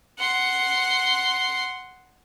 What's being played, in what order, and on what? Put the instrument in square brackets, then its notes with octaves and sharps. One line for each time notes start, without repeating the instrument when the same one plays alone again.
[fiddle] F#5 C6